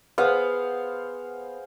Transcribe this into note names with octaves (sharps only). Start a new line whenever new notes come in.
B3 G#4 C5 F5 F#5